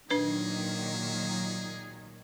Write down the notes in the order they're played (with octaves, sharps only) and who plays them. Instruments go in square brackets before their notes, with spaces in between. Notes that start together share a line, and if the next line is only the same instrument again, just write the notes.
[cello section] A#2 D#3 F#3 [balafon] D4 B4 [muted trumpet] G#4